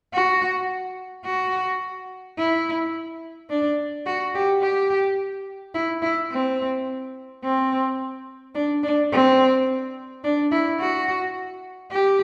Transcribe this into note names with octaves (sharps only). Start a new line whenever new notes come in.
F#4
F#4
E4
D4
F#4
G4
G4
E4
E4
C4
C4
D4
D4
C4
D4
E4
F#4
G4